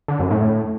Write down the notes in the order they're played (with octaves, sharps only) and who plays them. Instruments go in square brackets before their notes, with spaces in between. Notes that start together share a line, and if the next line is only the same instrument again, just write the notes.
[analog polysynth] D3
F#2
A2